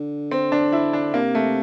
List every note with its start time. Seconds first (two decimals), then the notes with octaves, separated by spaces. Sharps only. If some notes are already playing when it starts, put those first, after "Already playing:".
Already playing: D3
0.31 C4
0.52 D4
0.73 E4
0.93 D4
1.14 C3 A#3
1.35 A3